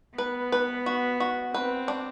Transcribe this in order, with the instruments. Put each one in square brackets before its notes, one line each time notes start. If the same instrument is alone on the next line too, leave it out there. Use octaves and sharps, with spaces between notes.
[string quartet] B3 [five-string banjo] B4
[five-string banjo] B4
F#4
F#4
[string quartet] C4 [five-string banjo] B4
[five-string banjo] D4